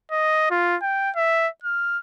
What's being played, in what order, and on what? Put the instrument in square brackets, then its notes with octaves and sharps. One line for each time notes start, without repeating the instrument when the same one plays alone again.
[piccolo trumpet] D#5
F4
G5
E5
F6